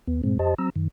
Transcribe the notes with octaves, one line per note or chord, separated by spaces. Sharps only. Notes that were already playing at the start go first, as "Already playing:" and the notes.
D#2 B3
G2 A#2 G#3 C4
F2 G4 C5 D#5 A5
F#3 C4 A#5 E6
F#2 D#3